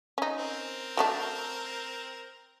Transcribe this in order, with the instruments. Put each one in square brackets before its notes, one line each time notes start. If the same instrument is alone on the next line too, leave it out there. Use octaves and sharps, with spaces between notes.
[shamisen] C#4 D#4
[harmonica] C4 A#4
[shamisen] F#3 A3 D4